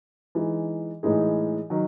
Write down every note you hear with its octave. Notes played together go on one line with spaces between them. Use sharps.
E3 G#3 D#4
A2 E3 G#3 D#4 G#4
D#3 F#3